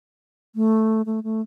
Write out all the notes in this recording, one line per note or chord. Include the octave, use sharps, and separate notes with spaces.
A3
A3
A3